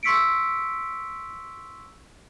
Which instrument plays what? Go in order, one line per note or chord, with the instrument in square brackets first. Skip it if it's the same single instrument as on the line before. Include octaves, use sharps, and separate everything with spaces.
[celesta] C6 C#6 E6 B6 C#7 D7